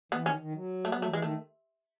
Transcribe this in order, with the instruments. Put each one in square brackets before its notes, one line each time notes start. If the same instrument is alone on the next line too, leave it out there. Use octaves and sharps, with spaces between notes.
[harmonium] E3 [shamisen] B3
[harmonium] D#3 [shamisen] C#4
[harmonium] D#3
F#3
[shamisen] A3
[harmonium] F#3 [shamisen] B3
[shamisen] A3
[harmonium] E3
[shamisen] G#3
[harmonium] D#3 [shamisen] A3